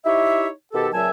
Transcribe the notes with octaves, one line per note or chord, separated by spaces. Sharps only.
D#4 E4 G4 C#5 E5
B2 D#3 G4 A4
C#2 A#2 F#3 E5 G#5 A5